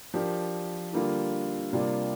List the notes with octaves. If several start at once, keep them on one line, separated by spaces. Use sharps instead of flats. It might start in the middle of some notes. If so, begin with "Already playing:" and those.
F3 D4 G4 A#4
D3 G3 A#3 F4
C3 G3 A#3 D4 F4